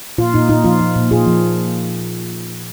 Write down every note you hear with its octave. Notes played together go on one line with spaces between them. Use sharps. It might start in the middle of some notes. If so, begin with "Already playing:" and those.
A#2 F4
A#2 D#4
A#2 D#4
F3 F4
F3
A#2
A#2 F4 G#4
F3